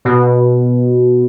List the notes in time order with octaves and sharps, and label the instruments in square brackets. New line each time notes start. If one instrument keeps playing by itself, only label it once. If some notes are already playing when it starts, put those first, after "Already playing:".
[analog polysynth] B2